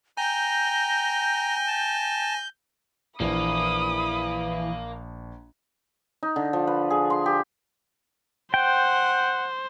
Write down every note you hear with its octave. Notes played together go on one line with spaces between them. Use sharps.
G5 G#5 A#5 G6 A#6
A5
A#1 E3 A#3 B5 D#6
D#4
D3
F3
B4
G#4
C6
G4
C5 F#5 G5